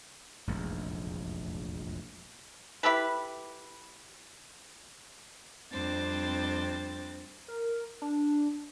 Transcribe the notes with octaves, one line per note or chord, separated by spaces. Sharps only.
F1 A#1 E2 G#2
E4 G4 A4 B4
F2 G3 C4 D4 C5 A6
A#4
D4